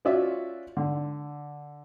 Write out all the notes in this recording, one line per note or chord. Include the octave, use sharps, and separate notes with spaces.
C#4 F4 F#4 D5 E5
D3